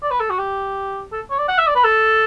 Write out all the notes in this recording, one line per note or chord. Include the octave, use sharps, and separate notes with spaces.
D5
B4
A4
F#4
G4
A4
C#5
D5
F#5
E5
D5
B4
A4